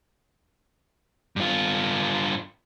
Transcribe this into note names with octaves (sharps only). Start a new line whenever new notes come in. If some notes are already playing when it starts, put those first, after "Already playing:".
G2 F4